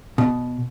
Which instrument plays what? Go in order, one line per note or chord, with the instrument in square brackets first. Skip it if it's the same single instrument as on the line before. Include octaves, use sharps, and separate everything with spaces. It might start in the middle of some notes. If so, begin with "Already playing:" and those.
[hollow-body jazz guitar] B2